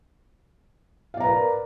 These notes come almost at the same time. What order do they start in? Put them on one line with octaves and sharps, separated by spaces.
F5 D5 A#5 B4 A#4